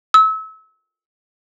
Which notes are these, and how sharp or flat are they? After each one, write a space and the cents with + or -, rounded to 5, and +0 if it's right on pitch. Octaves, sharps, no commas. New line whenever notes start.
E6 -30